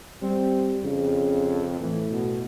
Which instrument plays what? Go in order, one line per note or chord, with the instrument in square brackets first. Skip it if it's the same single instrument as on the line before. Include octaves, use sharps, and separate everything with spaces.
[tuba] G3 [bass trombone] C4
[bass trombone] F2 [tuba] C#3
[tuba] A2 [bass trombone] E3
[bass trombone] B2